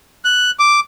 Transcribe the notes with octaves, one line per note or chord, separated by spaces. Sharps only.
F#6
D6